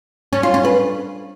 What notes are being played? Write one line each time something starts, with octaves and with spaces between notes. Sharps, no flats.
C#4
F4
C#4
B4